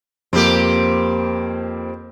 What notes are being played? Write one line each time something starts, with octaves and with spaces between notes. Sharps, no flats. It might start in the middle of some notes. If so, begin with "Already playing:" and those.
F2 A#3 C4 G4